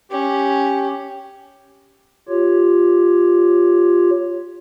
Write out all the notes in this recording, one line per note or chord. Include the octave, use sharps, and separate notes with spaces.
C#4 G4
F4 G4 C#5